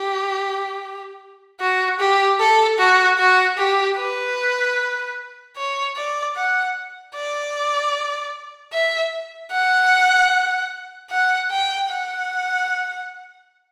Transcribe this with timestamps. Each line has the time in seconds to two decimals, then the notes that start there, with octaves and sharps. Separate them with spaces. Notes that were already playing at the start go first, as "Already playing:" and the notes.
Already playing: G4
1.61 F#4
2.00 G4
2.40 A4
2.79 F#4
3.19 F#4
3.58 G4
3.99 B4
5.57 C#5
5.96 D5
6.36 F#5
7.15 D5
8.73 E5
9.52 F#5
11.11 F#5
11.51 G5
11.90 F#5